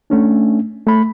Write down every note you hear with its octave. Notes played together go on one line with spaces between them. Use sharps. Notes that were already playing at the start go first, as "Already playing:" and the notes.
A3 C#4 D4
A3 B5